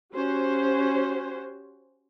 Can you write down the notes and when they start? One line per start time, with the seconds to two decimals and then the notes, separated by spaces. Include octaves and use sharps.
0.14 C#4 F#4 G4 C5